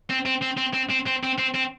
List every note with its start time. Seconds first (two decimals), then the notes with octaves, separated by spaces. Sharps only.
0.10 C4
0.26 C4
0.42 C4
0.58 C4
0.74 C4
0.90 C4
1.06 C4
1.23 C4
1.38 C4
1.54 C4